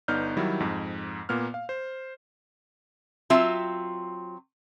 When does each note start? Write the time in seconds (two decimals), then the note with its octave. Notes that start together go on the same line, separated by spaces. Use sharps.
0.08 G1 B3 D#4 D5 F6 G6
0.37 D#3 F#3 G3 E4
0.60 F2 G#2
1.29 A#2 A#3 B3 F6
1.54 F5
1.69 C5
3.30 F#3 C4 F4 E5